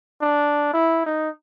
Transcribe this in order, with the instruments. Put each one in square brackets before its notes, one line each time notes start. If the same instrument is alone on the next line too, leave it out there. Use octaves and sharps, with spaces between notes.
[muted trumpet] D4
E4
D#4